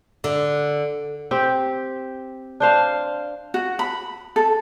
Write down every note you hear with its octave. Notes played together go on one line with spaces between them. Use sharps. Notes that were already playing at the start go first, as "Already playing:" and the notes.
D3
C4 G4
D4 C5 F5
F#4
B5
A4